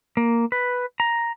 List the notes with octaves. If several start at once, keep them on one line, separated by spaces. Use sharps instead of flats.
A#3
B4
A#5